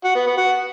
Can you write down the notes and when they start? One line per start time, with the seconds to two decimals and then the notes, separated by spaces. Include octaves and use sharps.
0.04 F#4
0.15 B3
0.26 B3
0.37 F#4